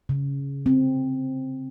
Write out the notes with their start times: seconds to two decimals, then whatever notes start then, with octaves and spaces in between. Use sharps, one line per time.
0.09 C#3
0.66 C4